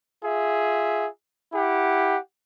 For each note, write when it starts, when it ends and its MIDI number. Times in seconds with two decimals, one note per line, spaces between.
0.24 1.07 65
0.24 1.07 68
0.24 1.07 76
1.53 2.17 64
1.53 2.17 67
1.53 2.17 78